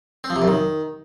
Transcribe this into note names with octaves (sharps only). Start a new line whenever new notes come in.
C4
F3
C3
F#2
D#3